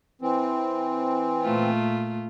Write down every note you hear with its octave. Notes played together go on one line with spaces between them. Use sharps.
E3 C4
A#2 A3 F4